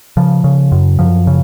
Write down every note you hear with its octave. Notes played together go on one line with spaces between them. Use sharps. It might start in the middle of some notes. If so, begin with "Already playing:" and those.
C#3 F3
C#3
F#2
F#2 F3
C#3